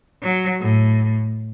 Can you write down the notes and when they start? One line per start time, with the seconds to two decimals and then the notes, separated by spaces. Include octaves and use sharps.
0.23 F#3
0.60 A2